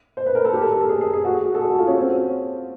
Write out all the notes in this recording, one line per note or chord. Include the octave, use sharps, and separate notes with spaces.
C5
B4
A#4
A4
G4
A4
A#4
A4
G#4
G#4
G#4
F#4
A4
G#4
F#4
F4
C#4
C4